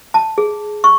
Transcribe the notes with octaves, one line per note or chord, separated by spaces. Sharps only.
A5
G#4
C#6